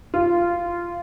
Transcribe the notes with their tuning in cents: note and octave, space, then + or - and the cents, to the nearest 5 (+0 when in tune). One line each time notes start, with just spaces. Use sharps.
F4 -15